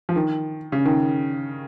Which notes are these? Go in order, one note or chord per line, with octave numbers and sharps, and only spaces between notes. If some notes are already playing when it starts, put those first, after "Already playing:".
F3
D#3
C#3
D#3